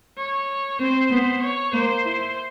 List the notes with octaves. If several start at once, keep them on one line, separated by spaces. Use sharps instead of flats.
C#5
C4 C5
B3
C#5
A#3 C5
E4